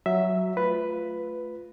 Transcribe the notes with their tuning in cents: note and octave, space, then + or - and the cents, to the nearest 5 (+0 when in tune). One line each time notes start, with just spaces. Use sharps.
F#3 +5 E5 +0
A3 +0 F4 +0 B4 +5